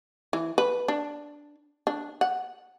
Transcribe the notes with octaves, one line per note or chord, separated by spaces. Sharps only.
E3
B4
D4
D4
F#5